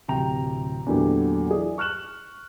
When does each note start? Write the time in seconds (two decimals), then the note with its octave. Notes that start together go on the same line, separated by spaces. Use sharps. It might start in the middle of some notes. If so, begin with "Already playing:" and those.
0.08 D1 C3 G5 A#5 F7
0.86 E2 A#2 D3 F#3 A3 G4
1.49 E4 G#4 D5
1.78 C#6 F6 F#6 E7 F#7